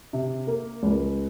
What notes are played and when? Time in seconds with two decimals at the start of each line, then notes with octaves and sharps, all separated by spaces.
0.13 C3
0.47 A#3
0.83 C#2